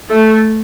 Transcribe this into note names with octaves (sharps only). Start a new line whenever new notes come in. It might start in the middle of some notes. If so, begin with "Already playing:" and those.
A3